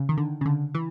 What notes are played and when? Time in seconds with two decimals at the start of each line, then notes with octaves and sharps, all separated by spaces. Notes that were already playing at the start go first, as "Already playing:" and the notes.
Already playing: C#3
0.09 D#3
0.17 D3
0.41 C#3
0.46 D3
0.75 E3